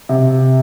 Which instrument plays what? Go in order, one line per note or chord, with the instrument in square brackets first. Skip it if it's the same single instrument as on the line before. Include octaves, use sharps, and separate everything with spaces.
[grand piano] C3